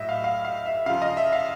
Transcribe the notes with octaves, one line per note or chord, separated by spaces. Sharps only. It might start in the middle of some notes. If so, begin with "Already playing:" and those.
Already playing: A2 F#3 D#5 E5
F5
F5
F5
E5
C#3 F3 F5
D#5
E5
F5